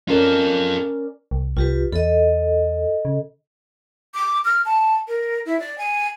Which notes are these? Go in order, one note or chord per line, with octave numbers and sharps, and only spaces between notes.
C#4 F4 A4 A#4 D5
C2
C2 F4 G4 B4
E2 A4 D#5
C#3
D6
F6
A5
A#4
E4
D5
G#5